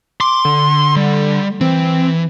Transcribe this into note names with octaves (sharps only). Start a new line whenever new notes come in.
C6 D6
D3
G3
E3 C4